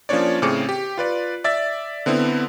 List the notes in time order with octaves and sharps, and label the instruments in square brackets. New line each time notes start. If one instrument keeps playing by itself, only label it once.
[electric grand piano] F3 A#3 C#4 D4 C#5 D5
A2 C#3 C4 G#4 D6 C#7
G4
F4 B4 D5
D5 E5 A6
D3 B3 C4 E4